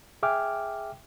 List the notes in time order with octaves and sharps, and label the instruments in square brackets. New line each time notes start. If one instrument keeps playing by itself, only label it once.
[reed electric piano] G#4 E5 G5 G#5 D6 F6